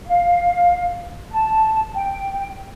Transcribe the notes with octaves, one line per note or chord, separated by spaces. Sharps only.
F5
A5
G5